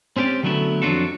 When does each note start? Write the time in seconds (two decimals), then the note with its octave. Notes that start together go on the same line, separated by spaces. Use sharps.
0.16 C4 C#4 G4 D5
0.43 D3 F#3 A3 B3 E4
0.82 F2 F#3 D4 F4 F#4 A4